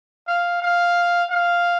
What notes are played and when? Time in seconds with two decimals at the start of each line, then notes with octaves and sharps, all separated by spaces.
0.28 F5
0.62 F5
1.30 F5